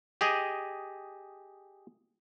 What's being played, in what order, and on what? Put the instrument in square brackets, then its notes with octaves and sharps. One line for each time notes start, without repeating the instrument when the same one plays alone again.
[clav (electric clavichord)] G4 G#4 D#5